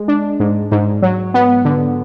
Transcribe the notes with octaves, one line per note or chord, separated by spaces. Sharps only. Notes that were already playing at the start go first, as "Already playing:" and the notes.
Already playing: G#3
D4
G#2
G#2
F#3
B3
D3